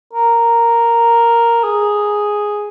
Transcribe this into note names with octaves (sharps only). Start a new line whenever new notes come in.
A#4
G#4